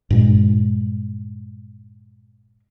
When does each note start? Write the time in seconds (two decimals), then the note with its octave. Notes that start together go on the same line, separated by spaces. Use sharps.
0.10 G2 A#2 G#3